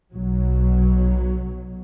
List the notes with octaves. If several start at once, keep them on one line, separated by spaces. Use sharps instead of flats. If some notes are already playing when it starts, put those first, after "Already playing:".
B1 B2 F#3